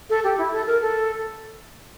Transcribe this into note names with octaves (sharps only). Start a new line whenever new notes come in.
A4
G4
E4
A4
A#4
A4